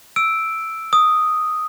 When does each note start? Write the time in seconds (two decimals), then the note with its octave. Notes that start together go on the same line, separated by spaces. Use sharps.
0.16 E6 D7
0.93 D#6